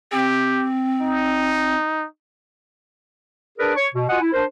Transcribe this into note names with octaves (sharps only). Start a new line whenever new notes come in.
C4 G4
D#4
D4 G#4 A#4 B4 D5
C#5 C#6
B2
F4 F#4 D#5 F#5 G#5
E4
D4 A#4 C5